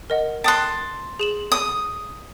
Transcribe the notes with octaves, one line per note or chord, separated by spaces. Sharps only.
A#4 D#5 F#5
G5 A5 C6 D#6 F#6
G#4 E7 F#7
D#6